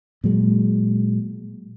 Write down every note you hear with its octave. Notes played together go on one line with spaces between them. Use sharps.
A#2 F#3 G#3